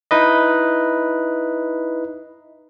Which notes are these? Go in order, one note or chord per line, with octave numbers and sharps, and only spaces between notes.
D#4 E4 B4 D#5